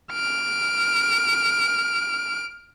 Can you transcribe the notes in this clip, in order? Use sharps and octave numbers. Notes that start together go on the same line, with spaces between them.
F6 D7